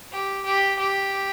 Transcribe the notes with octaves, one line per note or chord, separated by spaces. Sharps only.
G4
G4
G4